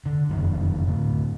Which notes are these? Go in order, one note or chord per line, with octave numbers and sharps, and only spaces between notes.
D3
F1 F#2 D#3
A2 D3